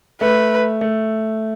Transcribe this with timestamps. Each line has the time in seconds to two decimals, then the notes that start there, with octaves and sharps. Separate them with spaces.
0.21 A3 B4
0.81 A3